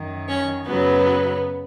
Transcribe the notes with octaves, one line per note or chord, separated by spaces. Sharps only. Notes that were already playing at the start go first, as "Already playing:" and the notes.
Already playing: F#2 D#3 F#3
C#4 C#5
F#2 C#3 F#3 B3 B4